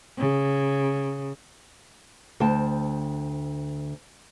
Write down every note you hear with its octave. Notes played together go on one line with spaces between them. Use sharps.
C#3
D2 C5 G5 A5